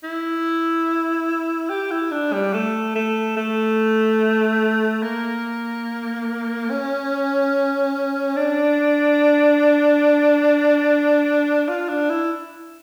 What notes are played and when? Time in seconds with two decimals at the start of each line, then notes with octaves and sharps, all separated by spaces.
0.04 E4
1.69 G4
1.91 E4
2.11 D4
2.33 G3
2.54 A3
2.95 A3
3.37 A3
5.03 A#3
6.70 C#4
8.36 D4
11.68 F4
11.89 D4
12.09 E4